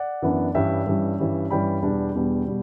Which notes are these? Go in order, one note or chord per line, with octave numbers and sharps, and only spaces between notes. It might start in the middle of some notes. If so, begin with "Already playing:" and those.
Already playing: D5 F#5
F#2 E3 B3 D4
G2 E3 G3 C#4 E5 G5
G2 E3 G3 C#4
G2 E3 G3 C#4
G2 E3 G3 C#4 G5 B5
E2 B2 G3 D4
E2 B2 G3 D4
B2 G3